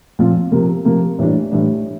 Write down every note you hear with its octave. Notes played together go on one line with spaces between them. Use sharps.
A#2 F3 C4 F4
C3 F3 A#3
C3 F3 A#3
A2 E3 G3 D4
A2 E3 G3 D4